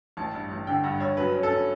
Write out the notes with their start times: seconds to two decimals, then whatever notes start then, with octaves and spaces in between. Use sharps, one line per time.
0.17 A1 A5
0.34 G2
0.51 A1
0.67 D3 G5
0.84 G2 F#5
1.00 G2 C#5
1.17 F#3 B4
1.35 C#4
1.43 A4
1.51 C#4